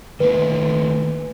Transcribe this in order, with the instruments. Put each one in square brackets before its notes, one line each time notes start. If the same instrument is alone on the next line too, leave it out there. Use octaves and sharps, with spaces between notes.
[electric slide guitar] D#3 A3 A#3 [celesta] B4